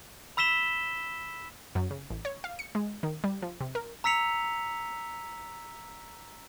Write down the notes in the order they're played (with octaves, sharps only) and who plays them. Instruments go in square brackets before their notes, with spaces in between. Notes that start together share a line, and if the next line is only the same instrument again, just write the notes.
[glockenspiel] B5 E6 B6 E7 G7
[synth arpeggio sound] F#2
C#3
A1
C#5
F5
C#7
G#3
D#3
G3
F3
C3
A#4
[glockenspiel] A#5 E6 B6 C#7 F7